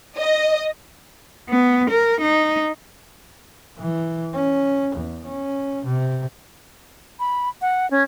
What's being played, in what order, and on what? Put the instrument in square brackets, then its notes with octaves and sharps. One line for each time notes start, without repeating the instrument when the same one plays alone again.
[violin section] D#5
[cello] B3
A#4
D#4
[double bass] E3
C#4
E2
C#4
C3
[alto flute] B5
F#5
C#4